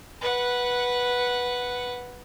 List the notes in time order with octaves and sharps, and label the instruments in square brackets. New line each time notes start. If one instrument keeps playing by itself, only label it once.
[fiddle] B4 F#5